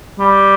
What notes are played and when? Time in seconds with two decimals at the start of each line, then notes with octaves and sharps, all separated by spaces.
0.19 G3